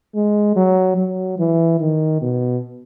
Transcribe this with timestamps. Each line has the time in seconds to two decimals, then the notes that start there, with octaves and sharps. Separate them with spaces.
0.15 G#3
0.56 F#3
0.97 F#3
1.38 E3
1.80 D#3
2.21 B2